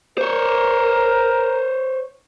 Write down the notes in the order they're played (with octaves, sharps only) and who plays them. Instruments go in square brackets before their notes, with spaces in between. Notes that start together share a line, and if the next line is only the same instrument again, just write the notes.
[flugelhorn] A#4 [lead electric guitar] C5 C#5